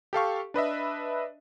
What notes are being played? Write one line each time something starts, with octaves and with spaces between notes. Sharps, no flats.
G4 A4 F5 C#6
D4 B4 D#5 E5